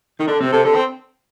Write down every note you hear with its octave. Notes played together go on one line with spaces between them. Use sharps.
D#3 D#4
D3 D4
C3 C4
C3 A4
D3 A4
C4